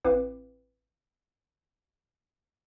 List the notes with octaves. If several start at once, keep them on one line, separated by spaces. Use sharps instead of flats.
A1 C4 E4 B4 F5 D6